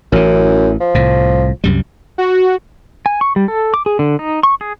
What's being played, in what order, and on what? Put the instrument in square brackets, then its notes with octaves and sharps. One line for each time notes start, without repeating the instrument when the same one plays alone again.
[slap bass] A1 E3 [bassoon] F#2
[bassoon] F3
[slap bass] C2 A2
C2 F#2 G3
[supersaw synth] F#4
[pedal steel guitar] G#5
C#6
G3
A4
D6
G#4
D3
D#4
C#6
G#4